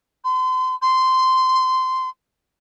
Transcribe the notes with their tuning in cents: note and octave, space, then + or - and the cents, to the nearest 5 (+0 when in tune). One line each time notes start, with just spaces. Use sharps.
C6 -35
C6 -15